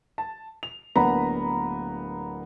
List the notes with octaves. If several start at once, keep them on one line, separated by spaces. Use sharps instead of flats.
A5
F7
D1 A#3 B3 D4 A#5 B5